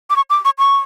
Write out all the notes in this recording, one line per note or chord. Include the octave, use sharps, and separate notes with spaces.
D6
C#6
D6
C#6
C#6